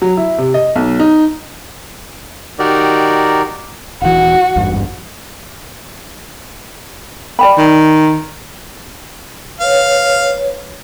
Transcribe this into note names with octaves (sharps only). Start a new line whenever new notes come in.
F#3
E4
C3
D#5
B1
D#4
D#3 D#4 F#4 G4 A#4 D5
D#1 E3 F#4
G#1 E2 G2
D5 G5 B5
D#3
B4 C#5 F5